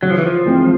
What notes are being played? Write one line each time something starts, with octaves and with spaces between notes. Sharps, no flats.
C#3 F#3
F3
E3
F3
E3 G#3 C4